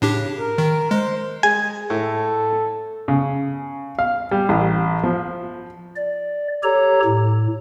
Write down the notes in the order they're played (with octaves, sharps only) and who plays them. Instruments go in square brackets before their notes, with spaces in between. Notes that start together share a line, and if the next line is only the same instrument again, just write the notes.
[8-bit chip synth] A2 D4 G4 [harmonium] C#3
[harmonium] A#4
[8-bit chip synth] D#3
[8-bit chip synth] G#3 [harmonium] C5
[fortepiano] G#3 [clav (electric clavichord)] G#5
[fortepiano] A2 [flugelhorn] A4
[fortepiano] C#3
F5
G3
A1
F3
[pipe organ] D5
G4 A4 C#5 A#5
A2